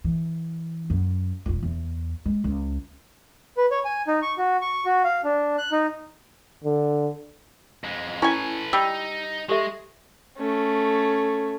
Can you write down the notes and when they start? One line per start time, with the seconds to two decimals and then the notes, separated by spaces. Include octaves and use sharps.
0.04 E3
0.90 F#2
1.46 E1 F4
1.63 E2
2.26 G#3
2.44 C#2
3.57 B4
3.71 C#5
3.85 G#5
4.07 D#4
4.22 C#6
4.38 F#4
4.62 C#6
4.85 F#4
5.04 F5
5.24 D4
5.58 F#6
5.72 D#4
6.64 D3
7.84 F2 G#3
8.22 C#4 E4 A4 B4 G#5
8.73 G3 D#4 E6
9.49 G#3 G4 A4 E5
10.37 A3 C#4